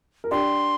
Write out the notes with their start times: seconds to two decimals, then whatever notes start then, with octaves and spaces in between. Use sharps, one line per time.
0.24 A#4
0.31 D4 G4 C6